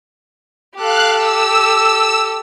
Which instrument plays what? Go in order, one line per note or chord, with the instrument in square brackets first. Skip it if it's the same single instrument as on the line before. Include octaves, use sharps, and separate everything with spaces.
[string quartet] G4 A4 [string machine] F5 F#6
[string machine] E6